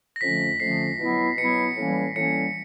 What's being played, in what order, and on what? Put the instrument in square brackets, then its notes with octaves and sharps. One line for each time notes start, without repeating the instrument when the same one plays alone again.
[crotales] A#6
[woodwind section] F2 D3 F3 A3 C#4 [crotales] B6
[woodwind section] F2 D3 F3 A3 C#4 [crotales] C7
[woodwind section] B2 F#3 B3 E4
[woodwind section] B2 F#3 B3 E4 [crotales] C#7
[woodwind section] A2 E3 G3 A#3 C#4
[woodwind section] A2 E3 G3 A#3 C#4 [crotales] C#7